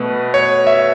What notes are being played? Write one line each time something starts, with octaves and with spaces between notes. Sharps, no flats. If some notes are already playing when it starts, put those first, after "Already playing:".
Already playing: B2 A3 B4
C#5
E5